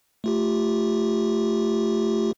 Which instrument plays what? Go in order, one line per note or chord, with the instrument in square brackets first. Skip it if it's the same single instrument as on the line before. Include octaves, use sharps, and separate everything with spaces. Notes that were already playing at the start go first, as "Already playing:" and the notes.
[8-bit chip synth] A3 F4 G4